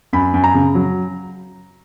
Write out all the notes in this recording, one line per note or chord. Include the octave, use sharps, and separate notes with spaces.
F#2 B5
F#2
A#5
C#3
F#3